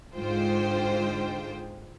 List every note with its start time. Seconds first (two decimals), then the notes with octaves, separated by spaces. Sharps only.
0.16 G#2 D3 G#3 F4 C5 G5